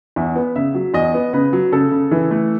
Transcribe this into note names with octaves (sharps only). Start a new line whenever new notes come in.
E2 E5
B3
C#3 E5
F#3
E2 D#5
B3
C#3 B4
F#3
C#3 A4
C#3
E3
A3